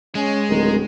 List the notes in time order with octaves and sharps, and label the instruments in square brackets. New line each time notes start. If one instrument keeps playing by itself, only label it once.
[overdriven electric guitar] G#3 [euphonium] C#4
[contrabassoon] D1 [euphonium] D#3